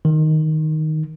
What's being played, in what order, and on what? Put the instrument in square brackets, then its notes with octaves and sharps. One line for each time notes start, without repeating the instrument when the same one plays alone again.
[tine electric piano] D#3